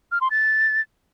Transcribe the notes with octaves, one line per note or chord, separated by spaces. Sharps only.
F6
C6
A6